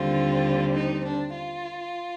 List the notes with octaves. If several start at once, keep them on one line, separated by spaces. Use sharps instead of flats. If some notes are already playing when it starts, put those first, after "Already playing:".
Already playing: D#2 D3 G3 C4 F4
D#4
D4
F4